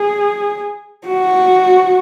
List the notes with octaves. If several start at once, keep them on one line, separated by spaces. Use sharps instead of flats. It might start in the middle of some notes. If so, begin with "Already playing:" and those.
Already playing: G#4
F#4